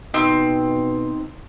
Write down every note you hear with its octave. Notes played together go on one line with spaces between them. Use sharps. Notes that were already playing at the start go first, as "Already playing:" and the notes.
B2 C4 D#4